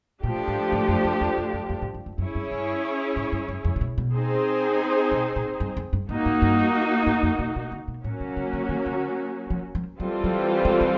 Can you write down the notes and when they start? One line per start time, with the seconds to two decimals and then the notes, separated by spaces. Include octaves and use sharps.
0.23 A#2 F3 A3 D4 G4
0.48 G#2
0.72 G#2
0.88 F#2
1.04 F2
1.21 E2
1.37 F2
1.53 F#2
1.70 F#2
1.82 G#2
1.94 F#2
2.06 F#2
2.18 F#2 C#4 E4 G#4 C#5
2.35 G2
2.52 G2
3.16 G#2
3.32 G2
3.48 F#2
3.65 F2
3.76 C3
3.81 B2
3.98 B2
4.14 C4 D#4 G#4 C5
5.12 B2
5.36 A#2
5.60 G2
5.77 F2
5.93 G2
6.09 G#2 A#3 D#4 F#4
6.26 G#2
6.42 G2
7.07 G#2
7.23 F2
7.39 B2
7.56 B2
7.72 D3
7.88 B2
8.04 A2 F#3 A#3 C#4 F#4
8.20 C3
8.37 C#3
8.53 D3
8.69 D#3
8.86 D3
9.50 F3
9.75 F3
10.00 E3 F#3 G3 C4 F4 A4
10.24 F#3
10.65 G#3
10.81 G#3